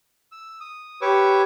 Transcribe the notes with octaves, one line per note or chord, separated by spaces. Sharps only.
E6
D#6
G4 B4 C#5 C#6 D6 E6